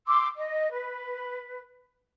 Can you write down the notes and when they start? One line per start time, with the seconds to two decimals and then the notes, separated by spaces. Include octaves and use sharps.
0.07 C6 D6 E6
0.36 D#5
0.71 B4